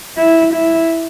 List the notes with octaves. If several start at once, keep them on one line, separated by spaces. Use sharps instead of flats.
E4
E4